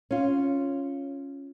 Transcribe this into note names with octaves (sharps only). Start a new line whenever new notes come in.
C#4 F4